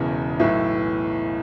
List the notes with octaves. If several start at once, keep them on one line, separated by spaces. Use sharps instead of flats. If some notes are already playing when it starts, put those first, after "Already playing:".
Already playing: E1 E2 C#3 E3
B1 A2 E3 E5